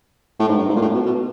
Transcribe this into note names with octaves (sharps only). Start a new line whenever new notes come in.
A2
G#2
G2
G#2
A#2
A2
B2
B2